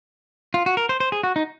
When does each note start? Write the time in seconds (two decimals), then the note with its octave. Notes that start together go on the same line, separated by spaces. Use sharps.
0.54 F4
0.66 F#4
0.77 A#4
0.89 C5
1.00 C5
1.12 G#4
1.23 F#4
1.36 D#4